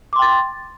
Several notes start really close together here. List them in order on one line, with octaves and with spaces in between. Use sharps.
D6 C6 G5 A6